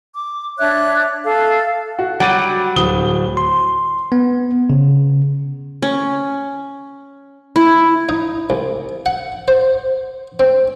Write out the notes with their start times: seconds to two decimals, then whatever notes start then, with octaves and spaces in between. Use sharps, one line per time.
0.14 D6
0.58 D4 C#5 E5 F#6
1.25 A4 F5
1.99 F#4
2.20 F#3 G3 F#5 A6 D#7
2.76 D1 D#6 G7
3.37 C6
4.12 B3
4.70 C#3
5.82 C#4
7.56 E4
8.09 D#4
8.50 C2
9.06 F#5
9.48 C5
10.40 C4